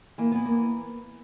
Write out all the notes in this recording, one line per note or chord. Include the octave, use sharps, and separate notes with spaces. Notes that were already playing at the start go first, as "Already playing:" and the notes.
E3 A#3
E3 B3
A#3